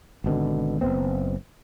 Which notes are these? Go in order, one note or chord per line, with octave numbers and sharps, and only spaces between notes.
G#1 B2 D3
F#1 G#2 B3 C4